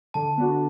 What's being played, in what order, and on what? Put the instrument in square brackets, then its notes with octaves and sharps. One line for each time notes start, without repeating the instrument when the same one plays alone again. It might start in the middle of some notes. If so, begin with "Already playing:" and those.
[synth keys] D3 [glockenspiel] A5
[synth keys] B3 D4 F#4